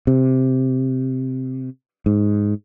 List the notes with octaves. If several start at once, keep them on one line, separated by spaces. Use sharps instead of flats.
C3
G#2